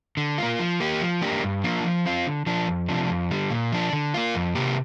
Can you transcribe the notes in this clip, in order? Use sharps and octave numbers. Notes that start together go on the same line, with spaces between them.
D3
A#3 F4
F3
A#3 G4
F3
A#3 D4 G4
G2
F3 A#3 D4 F4
F3
C4 F4
D3
F3 D4
F2
C3 F3 D4
F2
D3 G3
A#2
F3 D4
D3
A#3 F4
F2
C3 A#3 G4